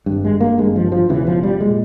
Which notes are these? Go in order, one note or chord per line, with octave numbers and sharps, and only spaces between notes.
G#1 G2
G#3
A#3
G#1 G2 G#3
F3
F3
E1 E2 C#3 E3
F3
G3
A#2 G#3